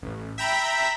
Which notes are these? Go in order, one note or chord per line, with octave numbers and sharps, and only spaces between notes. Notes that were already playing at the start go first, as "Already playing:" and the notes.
A1
E5 G5 A#5 B5